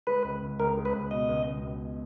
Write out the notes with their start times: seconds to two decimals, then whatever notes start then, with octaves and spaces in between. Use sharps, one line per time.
0.07 G#3 B4
0.24 C#2
0.42 C#2
0.59 C#2 A#4
0.77 G#3
0.85 B4
0.93 C#2
1.11 B2 D#5
1.29 C#2
1.47 C#2
1.64 C#2